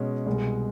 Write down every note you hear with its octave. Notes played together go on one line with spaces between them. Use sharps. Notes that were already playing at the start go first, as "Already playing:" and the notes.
Already playing: B2 G#3 C#4
C2 B2 G#3